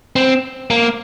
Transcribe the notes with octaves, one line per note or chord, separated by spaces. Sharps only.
C4
A#3